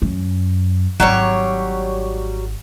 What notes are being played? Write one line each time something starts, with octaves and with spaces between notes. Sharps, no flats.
F#2
G#1 F#3 G3 C#5